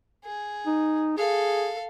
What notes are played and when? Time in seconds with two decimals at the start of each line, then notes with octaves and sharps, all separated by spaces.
0.24 G#4
0.66 D#4
1.17 G#4 A4 F5